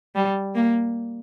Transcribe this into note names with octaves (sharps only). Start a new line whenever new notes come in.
G3
A#3